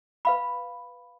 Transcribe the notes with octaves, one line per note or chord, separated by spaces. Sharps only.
B4 F5 B5